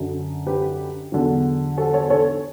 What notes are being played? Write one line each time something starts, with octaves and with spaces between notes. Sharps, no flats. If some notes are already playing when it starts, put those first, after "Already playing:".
Already playing: F#2 D3 F#3
G4 B4
E2 D3 F#3
F#4 A4
A4 C#5
A4 C#5